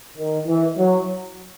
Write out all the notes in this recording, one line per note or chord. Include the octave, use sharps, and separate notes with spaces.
D#3
E3
F#3